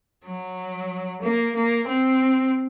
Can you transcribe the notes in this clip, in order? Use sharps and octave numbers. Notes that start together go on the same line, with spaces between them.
F#3
A#3
A#3
C4